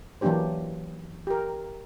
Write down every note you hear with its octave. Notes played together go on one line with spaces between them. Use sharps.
E3 F#3 A#3 D4 G4 C5
G4 A#4